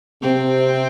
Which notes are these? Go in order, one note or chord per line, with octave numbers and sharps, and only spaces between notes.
C3 C4